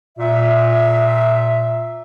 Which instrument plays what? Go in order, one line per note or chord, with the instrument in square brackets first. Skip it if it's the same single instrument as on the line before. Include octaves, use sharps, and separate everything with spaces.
[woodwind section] A#2 E5